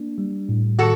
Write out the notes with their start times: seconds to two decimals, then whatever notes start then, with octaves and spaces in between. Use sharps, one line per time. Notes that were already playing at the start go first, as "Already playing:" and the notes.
Already playing: A#3 D4
0.18 G3
0.49 A2
0.79 D#3 F#4 A4